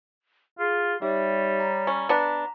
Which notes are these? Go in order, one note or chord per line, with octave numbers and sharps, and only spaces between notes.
F4 G#4
G3 D#4 G4 C#5 E5
A#5
C#4
B3 D4 A#5 B5